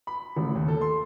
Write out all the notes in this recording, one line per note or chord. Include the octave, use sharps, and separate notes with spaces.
B5
A1
D#2
A4
C6